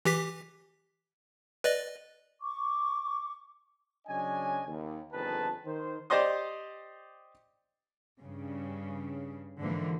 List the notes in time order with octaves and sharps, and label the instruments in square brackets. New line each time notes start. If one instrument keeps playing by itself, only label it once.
[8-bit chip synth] E3 G4 B6
B4 D5 D#5
[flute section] C#6 D6
[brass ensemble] C#3 F#3 D4 C#5 D#5 G#5
D#2
G1 F2 D#3 G#4 B4 A5
D#3 C5
[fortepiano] G4 C5 D5 D#5 C6 D#6
[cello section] G2 C#3
G#2 D3 E3 F3 A#3